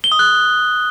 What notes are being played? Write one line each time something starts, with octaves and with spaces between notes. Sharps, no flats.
G7
D#6
F#6